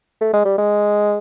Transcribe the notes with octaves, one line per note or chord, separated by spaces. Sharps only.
A3
G#3
G3
G#3